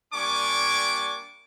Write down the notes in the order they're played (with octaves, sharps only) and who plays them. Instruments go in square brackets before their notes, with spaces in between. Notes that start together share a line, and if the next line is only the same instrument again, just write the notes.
[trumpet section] G3 A#3 D4 G#5 C#6 D6